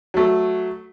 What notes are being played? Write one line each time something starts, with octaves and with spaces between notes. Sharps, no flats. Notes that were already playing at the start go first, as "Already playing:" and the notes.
F#3 A3